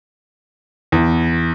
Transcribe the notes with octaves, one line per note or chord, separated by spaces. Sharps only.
E2